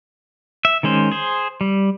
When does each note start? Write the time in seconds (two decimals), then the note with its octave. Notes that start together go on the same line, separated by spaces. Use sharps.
0.65 E5
0.83 D#3 G#3 C#4 C5
1.12 G#4 C5
1.61 G3